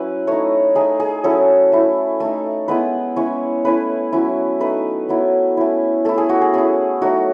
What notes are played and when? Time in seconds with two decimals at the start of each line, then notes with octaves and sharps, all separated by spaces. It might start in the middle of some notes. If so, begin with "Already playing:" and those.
Already playing: F#3 C#4 E4 B4
0.27 A3 D#4 C#5
0.75 A3 D#4 G#4
1.00 G#4
1.24 F#3 C#4 E4 A4
1.72 A3 E4
2.20 A3 D#4
2.68 G#3 B3 E4 B4
3.16 G#3 C#4 E4 C#5
3.65 A3 C#4 E4 B4
4.12 F#3 C#4 E4
4.60 A3 D#4 B4
5.09 F#3 B3 E4
5.57 A3 C#4 E4
6.05 A3 E4 A4
6.18 G#4
6.29 F#4
6.41 G#4
6.53 A3 C#4 E4 G#4
7.02 F#3 A3 D#4 F#4